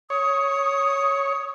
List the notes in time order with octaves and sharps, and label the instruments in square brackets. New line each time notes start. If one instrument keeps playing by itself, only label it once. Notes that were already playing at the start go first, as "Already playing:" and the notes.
[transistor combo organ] C#5 [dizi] D#6